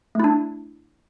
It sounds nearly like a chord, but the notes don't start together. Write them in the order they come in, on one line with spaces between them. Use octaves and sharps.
A3 E4 D4